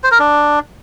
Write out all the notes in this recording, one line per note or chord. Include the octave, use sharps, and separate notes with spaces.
C5
A#4
D4